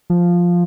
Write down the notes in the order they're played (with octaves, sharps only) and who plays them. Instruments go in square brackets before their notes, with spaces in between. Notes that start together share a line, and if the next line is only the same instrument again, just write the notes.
[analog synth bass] F3